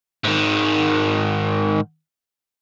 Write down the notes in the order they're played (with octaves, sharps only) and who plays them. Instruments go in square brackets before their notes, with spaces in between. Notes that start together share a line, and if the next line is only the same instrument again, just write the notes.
[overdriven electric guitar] G#2 D#3